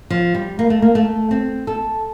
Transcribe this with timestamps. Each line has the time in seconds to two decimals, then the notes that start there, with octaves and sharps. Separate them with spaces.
0.10 F3
0.35 G3
0.59 A#3
0.70 A3
0.82 A#3
0.95 A3
1.31 C4
1.67 A4